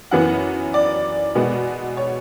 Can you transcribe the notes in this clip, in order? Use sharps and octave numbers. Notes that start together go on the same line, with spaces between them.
F#2 E3 B3 F#5
D5
B2 G#3 B3
C#5